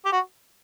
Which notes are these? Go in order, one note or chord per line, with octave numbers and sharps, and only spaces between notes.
G4
F#4